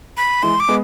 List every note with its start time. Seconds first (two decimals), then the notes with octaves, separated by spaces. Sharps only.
0.17 B5
0.43 E3 G#3 C6
0.60 D6
0.68 G#3 B3